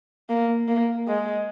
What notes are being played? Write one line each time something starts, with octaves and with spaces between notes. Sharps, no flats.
A#3
A#3
G#3